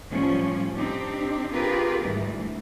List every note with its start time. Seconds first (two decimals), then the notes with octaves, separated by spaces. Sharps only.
0.10 A2 F3 G3 C#4
0.75 C4 D4 D#4 G4
1.51 C4 F4 G4 G#4 A#4 B4
2.02 D2 G#2 E3 G3